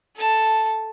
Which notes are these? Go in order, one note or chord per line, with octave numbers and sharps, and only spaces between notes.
A4 A5